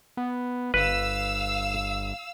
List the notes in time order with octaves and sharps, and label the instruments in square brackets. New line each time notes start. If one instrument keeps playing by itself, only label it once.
[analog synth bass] B3
[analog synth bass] G1 [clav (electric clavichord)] B4 [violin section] F5 E6